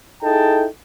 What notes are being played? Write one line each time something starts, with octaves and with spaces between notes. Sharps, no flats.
D#4 E4 G#4 A4 G5 A5